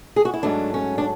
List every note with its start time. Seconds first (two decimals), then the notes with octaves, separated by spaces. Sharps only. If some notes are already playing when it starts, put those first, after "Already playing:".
0.16 G#4
0.25 F#4
0.34 E4
0.43 G#2 F#3 A3 D4
0.74 C#4
0.98 D4